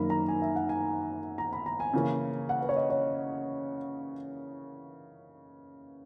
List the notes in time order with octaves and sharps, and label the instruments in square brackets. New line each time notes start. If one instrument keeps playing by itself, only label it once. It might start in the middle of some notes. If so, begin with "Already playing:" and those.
Already playing: [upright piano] F#2 D#3 A#3 A#5 B5
A#5
G#5
E5
F#5
G#5
A#5
B5
A#5
G#5
C#3 E3 A#3 C#4
F#5
B4
C#5
D#5
C#5